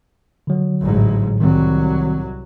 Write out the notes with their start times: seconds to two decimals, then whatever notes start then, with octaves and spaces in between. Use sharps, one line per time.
0.47 D3 F#3
0.81 A1 G#2
1.40 C2 D#3 F#3 G3 C4